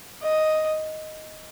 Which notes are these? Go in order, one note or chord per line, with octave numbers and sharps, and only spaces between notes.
D#5